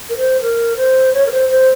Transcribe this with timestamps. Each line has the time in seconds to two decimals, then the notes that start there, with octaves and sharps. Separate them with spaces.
0.10 A#4
0.17 C5
0.41 A#4
0.77 C5
1.13 C#5
1.27 A#4
1.31 C5
1.49 C5